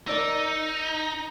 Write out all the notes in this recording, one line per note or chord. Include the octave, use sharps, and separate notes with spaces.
D#4 A#4 D5 E6